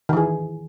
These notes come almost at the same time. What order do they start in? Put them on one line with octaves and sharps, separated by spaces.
D#3 E3 G#4